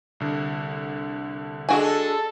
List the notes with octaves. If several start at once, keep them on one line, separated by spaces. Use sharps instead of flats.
C2 D3
G#3 D4 F#4 A4 G#5